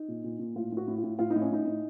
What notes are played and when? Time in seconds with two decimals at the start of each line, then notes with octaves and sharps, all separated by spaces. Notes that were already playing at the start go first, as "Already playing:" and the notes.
Already playing: D#4
0.08 A#2
0.24 A#2
0.39 A#2
0.56 A2 F4
0.72 A2 F#4
0.88 A2
0.98 F4
1.04 A2
1.19 A2 F4
1.30 D#4
1.36 A2
1.41 C#4
1.51 A2 D#4
1.67 A2